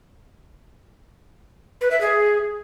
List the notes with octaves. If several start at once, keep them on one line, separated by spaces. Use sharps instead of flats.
B4
E5
G#4